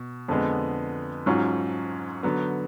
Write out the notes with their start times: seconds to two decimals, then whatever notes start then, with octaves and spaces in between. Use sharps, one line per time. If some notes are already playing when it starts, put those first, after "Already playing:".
Already playing: B2
0.28 F2 D3 G#3 B3
1.26 G#2 F#3 C#4 F4
2.23 D3 F#3 B3